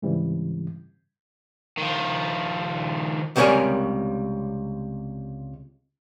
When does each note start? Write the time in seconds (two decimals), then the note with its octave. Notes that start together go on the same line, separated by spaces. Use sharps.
0.02 G#2 C#3 E3 G3 C4
1.77 D#3 F3
3.36 C#2 C3 G3 A#4 C#5 G#5